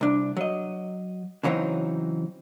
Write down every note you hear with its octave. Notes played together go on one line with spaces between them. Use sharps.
C2 D4
F#3 D#5
C#3 E3 F#3 C4 D#4